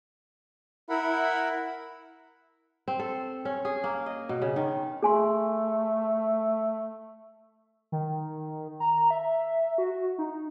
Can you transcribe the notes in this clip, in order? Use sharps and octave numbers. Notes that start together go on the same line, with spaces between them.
E4 A#4 F#5 B5
C4
A4
C#4
G#4
A#3
D#5
B2
C#3
D#3
A3 G#4 G#5 C6
D#3
A#5
E5
F#4
D#4